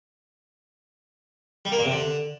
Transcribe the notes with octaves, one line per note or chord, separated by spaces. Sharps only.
G3
A#3
A#2
C3
D3